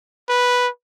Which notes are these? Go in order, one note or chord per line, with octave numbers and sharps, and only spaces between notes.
B4